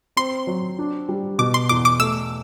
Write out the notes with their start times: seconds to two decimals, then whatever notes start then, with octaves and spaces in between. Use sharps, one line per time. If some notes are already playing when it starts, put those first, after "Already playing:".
0.17 C4 C6
0.47 F#3
0.79 D4
1.09 G3
1.39 B2 D6
1.54 C6
1.69 E2 D6
1.85 D6
1.99 A3 E6